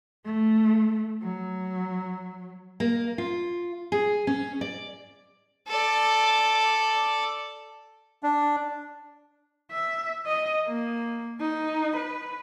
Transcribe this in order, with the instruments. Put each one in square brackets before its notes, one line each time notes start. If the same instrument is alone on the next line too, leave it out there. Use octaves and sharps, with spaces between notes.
[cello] A3
F#3
[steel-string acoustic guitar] A#3
F4
G#4
C#4
D5
[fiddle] A4 D5
[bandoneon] D4
[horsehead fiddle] E5
D#5
A#3
D#4
B4